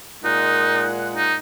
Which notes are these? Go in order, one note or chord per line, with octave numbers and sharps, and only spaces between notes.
A#2 G#3 D#4 F#5
D#4